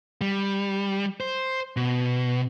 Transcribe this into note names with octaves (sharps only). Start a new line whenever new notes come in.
G3
C5
B2